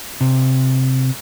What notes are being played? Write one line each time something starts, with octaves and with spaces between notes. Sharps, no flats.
C3